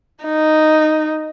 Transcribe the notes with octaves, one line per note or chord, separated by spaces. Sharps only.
D#4